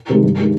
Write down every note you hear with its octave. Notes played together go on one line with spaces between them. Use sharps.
C3 D#3 G#3
G2
D#3 G#3